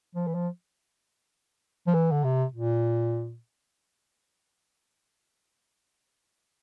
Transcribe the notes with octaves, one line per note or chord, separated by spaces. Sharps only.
F3
E3
F3
F3
E3
D3
C3
A#2